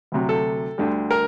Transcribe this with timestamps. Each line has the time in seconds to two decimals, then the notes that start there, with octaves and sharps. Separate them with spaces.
0.12 D2 C3 F#3
0.29 A4
0.78 D2 D3 G3
1.11 A#4